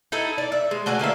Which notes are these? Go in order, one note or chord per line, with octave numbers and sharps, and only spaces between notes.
D#4 E4 A4
D5
E5
G#3
A3 F#4 D5 G#5
D3 A#3 E4 E5